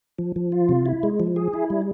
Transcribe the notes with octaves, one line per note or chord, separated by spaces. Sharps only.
F3
F3
F4
C3
E4
G#3
F3
G#4
E4
G3